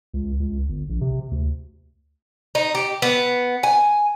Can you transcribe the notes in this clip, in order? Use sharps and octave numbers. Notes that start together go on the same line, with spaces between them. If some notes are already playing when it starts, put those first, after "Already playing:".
C#2
C#2
G1
A#1
C3
D2
D#4
G4
B3
G#5